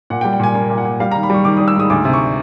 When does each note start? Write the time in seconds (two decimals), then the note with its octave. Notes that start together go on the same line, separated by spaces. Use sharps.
0.10 A#2 F#5
0.21 G5
0.25 G3
0.33 G5
0.40 A#2 G#5
0.55 A#3 G#5
0.70 A#2
0.78 F#5
0.85 A#2
1.00 G3 F5
1.11 D#3 A#5
1.23 B5
1.30 G3 C#6
1.45 D#3 D6
1.57 G3 D#6
1.68 E6
1.76 G#2 D#6
1.90 D2 D6
2.05 C3
2.13 C#6